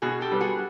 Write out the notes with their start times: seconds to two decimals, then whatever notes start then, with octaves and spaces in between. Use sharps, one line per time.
0.02 B2 F#4 G#4
0.21 G4 A4
0.32 G3 B3
0.40 F#4 G#4